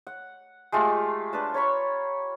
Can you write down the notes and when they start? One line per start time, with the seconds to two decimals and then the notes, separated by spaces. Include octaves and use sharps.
0.07 F#5
0.72 G#3 A3 F4 G4
1.33 D4 B4 A5
1.54 C#5 A#5 B5 C#6